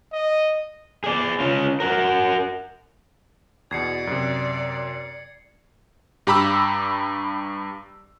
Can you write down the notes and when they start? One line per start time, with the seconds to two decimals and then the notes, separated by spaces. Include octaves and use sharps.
0.12 D#5
1.04 G#4 D5
1.40 C#4 F4
1.80 F#4 A#4
3.71 E2 B2 D5 G#6 C7 C#7
4.07 F#2 C3
6.27 G2 G4 A#5 B5 D6 E6